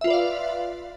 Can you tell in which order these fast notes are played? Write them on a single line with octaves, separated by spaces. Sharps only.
E5 F4 B4 D5 F5